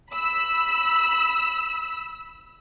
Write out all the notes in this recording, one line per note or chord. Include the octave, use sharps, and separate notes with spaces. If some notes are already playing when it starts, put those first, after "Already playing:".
B5 E6